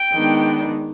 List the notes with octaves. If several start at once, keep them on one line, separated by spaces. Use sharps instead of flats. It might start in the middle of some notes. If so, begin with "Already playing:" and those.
Already playing: G5
D#3 G#3 B3 D4